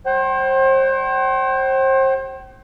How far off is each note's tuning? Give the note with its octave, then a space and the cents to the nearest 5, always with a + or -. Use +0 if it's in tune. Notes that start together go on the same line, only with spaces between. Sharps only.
G3 +0 C5 +35 G5 -40